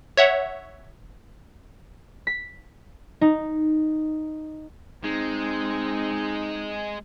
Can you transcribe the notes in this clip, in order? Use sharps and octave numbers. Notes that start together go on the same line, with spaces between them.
C#5 E5 F#5
B6
D#4
G#3 C4 D#4